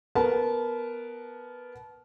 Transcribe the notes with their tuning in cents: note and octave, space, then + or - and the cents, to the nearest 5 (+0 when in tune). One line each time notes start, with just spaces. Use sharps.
B3 +0 A#4 +0 A5 -25